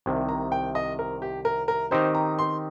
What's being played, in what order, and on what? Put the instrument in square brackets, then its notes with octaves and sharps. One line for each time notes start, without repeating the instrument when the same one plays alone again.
[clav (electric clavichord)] C2 C3 D#3
[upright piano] A#5
G5
D#5
A#4
G4
A#4
A#4
[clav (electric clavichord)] D#3 C4 D#4 G4 [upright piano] C5
[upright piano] A#5
C6